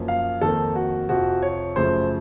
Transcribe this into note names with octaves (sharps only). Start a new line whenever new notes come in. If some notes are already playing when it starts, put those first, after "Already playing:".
Already playing: F#2 F3 A#3
F5
F2 D#3 A#3 A4
F#4
F2 C3 F3 F#4
C#5
F#2 C#3 F3 A3 C5